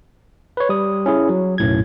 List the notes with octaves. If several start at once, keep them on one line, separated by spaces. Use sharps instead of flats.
B4 C#5
G3 D#6
C#4 E4 G#4
F#3
B1 F#2 A2 G#6